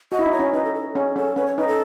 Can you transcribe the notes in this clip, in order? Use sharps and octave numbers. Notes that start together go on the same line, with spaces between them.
F#4 D#5
E4
D#4
C#5
C#4
D#4 B4
A4
A4
C#4 G#4
C#4 A4
C#4 B4
C#5
D#4 B4
A4